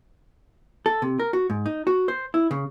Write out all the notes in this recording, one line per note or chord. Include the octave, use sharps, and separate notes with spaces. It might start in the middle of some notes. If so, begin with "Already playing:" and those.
A4
C3
A#4
F#4
G#2
D#4
F#4
C5
E4
C#3